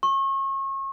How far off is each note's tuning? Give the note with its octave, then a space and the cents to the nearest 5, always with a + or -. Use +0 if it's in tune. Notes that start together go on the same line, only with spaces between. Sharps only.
C#6 -35